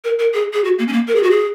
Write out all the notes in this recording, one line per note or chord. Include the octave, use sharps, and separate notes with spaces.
A#4
A#4
G#4
G#4
F#4
A#3
C#4
A#3
A#4
G#4
F#4
G#4